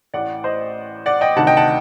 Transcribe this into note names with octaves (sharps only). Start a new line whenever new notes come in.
A1 A2 D5 F#5
C5 D#5
D5 F#5
D#5 G5
D2 C3 D#3 F#5 A5
D#5 G5
F#5 A5